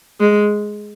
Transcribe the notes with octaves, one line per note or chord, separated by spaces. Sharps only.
G#3